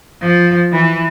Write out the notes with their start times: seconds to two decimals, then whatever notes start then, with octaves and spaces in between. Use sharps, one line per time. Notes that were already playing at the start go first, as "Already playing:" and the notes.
0.22 F3
0.72 E3